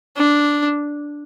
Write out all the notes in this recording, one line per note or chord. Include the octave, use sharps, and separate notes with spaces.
D4